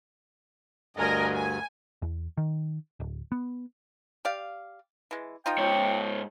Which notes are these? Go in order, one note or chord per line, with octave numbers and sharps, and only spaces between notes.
D2 G2 A#4 D#5 G#5
G#5
E2
D#3
D1
B3
G4 D5 F5
E3 G#3
F3 D#4 F4 G5
G#2 C#5